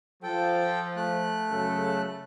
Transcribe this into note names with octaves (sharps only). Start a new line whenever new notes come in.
F3 A4 G5
A3 F#6
F#2 C#3 A4